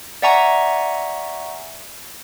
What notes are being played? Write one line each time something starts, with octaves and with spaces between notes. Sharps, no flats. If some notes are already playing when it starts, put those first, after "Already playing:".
D5 E5 F#5 G#5 A#5 C#6